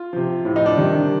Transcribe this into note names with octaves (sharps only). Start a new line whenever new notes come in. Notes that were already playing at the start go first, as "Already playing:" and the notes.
Already playing: F4
C3 F3
A2 F3
D#4
D4
C3 D#3 G3